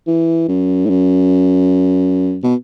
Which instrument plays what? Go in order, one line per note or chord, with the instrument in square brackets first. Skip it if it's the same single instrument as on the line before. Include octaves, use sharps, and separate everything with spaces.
[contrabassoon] E3
F#2
A2
F#2
B2